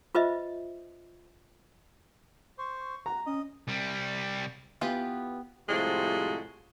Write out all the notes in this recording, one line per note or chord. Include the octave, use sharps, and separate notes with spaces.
F4 B4 C5 D#5 E5
C5 C#6
F#4 A#5
C#4 D#5
C2 G3
E3 B3 F4 G4 B4
A2 C3 F3 G3 G#3 F#4